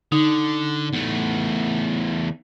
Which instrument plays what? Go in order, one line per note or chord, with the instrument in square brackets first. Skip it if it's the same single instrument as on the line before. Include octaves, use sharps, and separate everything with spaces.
[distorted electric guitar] D3 [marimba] D#4
[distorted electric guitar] E2 A3